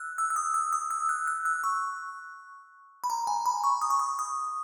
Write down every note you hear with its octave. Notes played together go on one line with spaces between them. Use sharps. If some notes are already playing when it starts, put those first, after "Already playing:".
Already playing: E6 F#6
E6
E6
D#6
E6
D#6
E6
F#6
F#6
E6
C#6
B5
A#5
G#5
B5
C#6
D#6
C#6
D#6
D#6